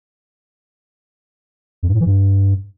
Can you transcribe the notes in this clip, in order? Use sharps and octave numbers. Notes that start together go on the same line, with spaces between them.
F2
G2
A2
E3
G2